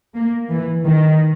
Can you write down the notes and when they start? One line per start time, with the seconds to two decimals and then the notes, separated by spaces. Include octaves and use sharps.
0.15 A#3
0.51 E3
0.87 D#3